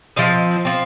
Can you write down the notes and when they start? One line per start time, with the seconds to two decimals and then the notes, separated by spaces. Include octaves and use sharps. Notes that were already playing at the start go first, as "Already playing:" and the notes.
0.16 F3 C4 D#5
0.65 F3 C4